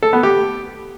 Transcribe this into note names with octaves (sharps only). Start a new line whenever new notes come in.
A4
B3
G4